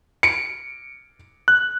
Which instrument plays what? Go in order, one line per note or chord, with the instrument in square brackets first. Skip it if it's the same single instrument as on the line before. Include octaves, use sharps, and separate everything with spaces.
[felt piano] C#7 D7
[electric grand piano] F#6